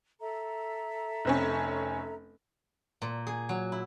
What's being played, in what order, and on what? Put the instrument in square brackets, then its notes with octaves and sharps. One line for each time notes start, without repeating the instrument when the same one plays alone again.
[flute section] A4 E5 A#5
[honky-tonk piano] F1 C4 C#4
[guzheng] A#2
G#4
F#3
E4